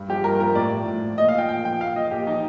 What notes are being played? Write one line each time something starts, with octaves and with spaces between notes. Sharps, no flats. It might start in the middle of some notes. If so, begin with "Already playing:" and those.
Already playing: G2
F3 G4
G2 A#4
F3 A#4
A2 D5
F3
A2
F3
A#2 D#5
F5
F3 G5
A#2 G5
F3 G5
A#2 F5
F3 D#5
A#2 G4
F3 D#4